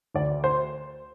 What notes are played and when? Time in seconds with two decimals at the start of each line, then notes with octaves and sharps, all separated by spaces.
0.14 D2 D5
0.44 C5